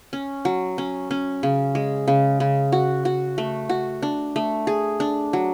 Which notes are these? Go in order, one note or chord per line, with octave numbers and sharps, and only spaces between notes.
C#4
F#3
C#4
C#4
C#3
G#3
C#3
C#3
F#4
F#4
A3
F#4
D4
A3
G#4
D4
F#3